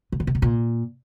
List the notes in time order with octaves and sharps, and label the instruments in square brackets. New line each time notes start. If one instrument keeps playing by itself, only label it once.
[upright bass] C3
D3
C3
B2
A#2